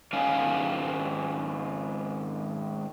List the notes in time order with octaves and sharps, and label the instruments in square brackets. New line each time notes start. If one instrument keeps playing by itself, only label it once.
[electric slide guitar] G#2 D#3 G#3 C#4 F5 G#5